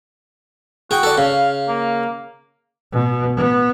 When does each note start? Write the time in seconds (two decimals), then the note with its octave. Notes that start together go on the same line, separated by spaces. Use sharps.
0.91 F#4 G#4 G5
1.03 A4 D5
1.18 C#3 F5
1.68 A#3
2.92 B2
3.36 B3